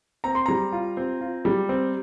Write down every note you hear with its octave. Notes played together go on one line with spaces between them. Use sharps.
C4 A#5
C6
G3 A#5
F4
C4
F4
G3
C4